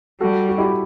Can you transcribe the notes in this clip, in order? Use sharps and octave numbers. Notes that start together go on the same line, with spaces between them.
G3 F#4 A4
F#4
E4 G4